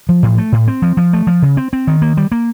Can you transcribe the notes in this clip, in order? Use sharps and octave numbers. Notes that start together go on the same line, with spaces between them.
F3
A2
A3
A2
C4
F3
F3
A3
F3
C#3
C4
C4
D#3
A#3
G3
A#3